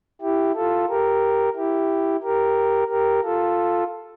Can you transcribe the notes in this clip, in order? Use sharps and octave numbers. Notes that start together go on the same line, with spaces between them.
E4 G4
F4 A4
G4 A#4
E4 G4
G4 A#4
G4 A#4
F4 A4